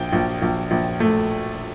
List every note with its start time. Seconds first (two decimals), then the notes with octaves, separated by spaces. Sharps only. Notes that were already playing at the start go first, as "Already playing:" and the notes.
Already playing: A#1 G5
0.13 A#1
0.42 A#1
0.71 A#1
1.00 A3